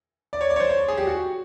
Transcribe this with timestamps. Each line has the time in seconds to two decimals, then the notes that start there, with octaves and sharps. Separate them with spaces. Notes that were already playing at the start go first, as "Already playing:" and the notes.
0.33 D5
0.41 C#5
0.50 D5
0.56 C#5
0.60 C5
0.69 C#5
0.88 G#4
0.97 G4
1.07 F#4